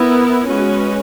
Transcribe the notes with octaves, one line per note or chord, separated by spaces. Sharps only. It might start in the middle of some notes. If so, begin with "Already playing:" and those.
Already playing: B3 E4 A#4
G#3 C#4 F#4 B4